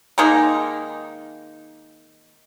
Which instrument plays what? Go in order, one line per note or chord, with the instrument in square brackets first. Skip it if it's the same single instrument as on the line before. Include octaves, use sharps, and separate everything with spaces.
[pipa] D#3 G#3 A#3 D#4